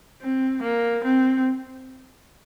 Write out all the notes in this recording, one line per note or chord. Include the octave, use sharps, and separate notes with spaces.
C4
A#3
C4